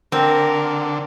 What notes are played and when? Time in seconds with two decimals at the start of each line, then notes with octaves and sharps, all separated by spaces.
0.12 D3 C4 A#4